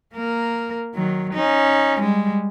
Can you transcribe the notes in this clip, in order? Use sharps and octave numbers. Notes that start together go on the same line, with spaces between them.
A#3 A#4
D#3 F#3
C#4 D#4
G3 G#3